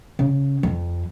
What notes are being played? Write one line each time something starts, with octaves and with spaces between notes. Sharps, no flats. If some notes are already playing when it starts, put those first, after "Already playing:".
C#3
F2